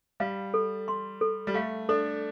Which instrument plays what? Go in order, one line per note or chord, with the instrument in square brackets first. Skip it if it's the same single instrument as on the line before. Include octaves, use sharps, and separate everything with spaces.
[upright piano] G3 [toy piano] F5
[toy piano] A4
C6
A4
[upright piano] G3
[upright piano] A3 [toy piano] F5
[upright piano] D4 [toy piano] A4